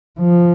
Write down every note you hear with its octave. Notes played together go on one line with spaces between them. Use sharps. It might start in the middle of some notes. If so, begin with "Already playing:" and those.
F3